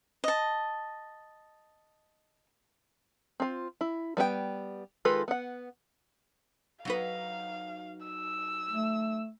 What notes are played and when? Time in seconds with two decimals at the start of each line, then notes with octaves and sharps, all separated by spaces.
0.24 D#5 A5
3.40 C4 F4
3.81 E4
4.17 G3 B3 D4 G5
5.05 D#3 G#3 F4 A4 B4
5.28 B3 F#5
6.85 F#3 D#4 B4 F5
8.06 E6
8.71 A3